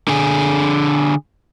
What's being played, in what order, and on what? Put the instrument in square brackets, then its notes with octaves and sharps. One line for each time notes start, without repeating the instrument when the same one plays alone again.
[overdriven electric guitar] D3 G#4